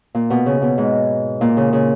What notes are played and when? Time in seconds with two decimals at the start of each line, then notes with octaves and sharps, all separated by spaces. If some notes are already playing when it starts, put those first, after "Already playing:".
0.15 A#2
0.30 B2
0.46 C#3
0.62 B2
0.78 G#2
1.41 A#2
1.57 C#3
1.73 C#3